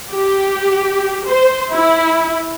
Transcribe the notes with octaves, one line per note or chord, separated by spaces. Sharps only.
G4
C5
E4